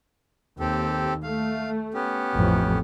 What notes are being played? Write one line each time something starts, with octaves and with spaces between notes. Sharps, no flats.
D#2 C4 G4 A4
A3 F5
B3 C#4 G4
A1 F2